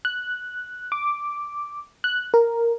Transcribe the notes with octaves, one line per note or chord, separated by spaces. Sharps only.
F#6
D6
F#6
A#4